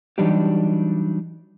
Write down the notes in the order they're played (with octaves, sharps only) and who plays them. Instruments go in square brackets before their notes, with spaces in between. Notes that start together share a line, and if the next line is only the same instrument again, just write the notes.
[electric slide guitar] E3 F#3 G3 D4 D#4 G4